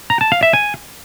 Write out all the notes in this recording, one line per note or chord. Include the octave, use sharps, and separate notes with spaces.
A#5
A5
F5
E5
G#5